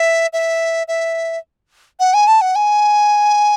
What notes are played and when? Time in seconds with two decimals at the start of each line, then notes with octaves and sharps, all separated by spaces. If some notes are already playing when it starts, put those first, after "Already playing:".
Already playing: E5
0.33 E5
0.88 E5
2.00 F#5
2.14 G#5
2.28 A5
2.41 F#5
2.55 G#5